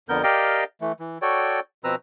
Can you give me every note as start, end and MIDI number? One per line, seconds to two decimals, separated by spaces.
0.09 0.23 41
0.09 0.23 50
0.09 0.23 59
0.09 0.23 70
0.09 0.23 91
0.23 0.64 67
0.23 0.64 70
0.23 0.64 74
0.23 0.64 75
0.23 0.64 77
0.23 0.64 79
0.81 0.92 52
0.81 0.92 57
1.00 1.18 52
1.22 1.60 66
1.22 1.60 69
1.22 1.60 73
1.22 1.60 74
1.22 1.60 79
1.84 1.95 47
1.84 1.95 53
1.84 1.95 60
1.84 1.95 71
1.84 1.95 82
1.84 1.95 88